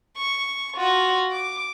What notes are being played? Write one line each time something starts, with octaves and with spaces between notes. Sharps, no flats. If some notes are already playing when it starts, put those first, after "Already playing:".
C#6
F4 F#4
D6